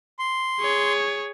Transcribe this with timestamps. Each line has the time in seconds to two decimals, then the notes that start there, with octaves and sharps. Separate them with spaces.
0.19 C6
0.60 G#4 C#5